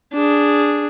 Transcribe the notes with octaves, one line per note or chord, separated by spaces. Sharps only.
D4 G#4